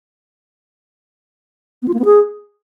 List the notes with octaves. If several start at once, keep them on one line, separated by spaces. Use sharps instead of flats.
B3
F4
A#3
B3
G#4